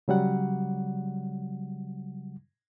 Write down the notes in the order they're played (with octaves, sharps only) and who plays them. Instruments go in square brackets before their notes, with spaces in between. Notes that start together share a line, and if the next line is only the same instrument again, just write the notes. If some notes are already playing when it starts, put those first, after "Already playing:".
[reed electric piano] C#3 F#3 G3 F#5